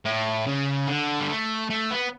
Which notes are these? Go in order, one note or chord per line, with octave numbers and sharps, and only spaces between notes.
A2
C#3
D3
G3
A3
A3
B3